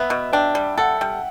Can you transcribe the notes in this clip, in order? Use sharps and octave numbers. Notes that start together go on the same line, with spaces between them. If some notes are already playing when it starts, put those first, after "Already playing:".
Already playing: B3 E5
B2
D4 G5
G3
A4 F#5
G3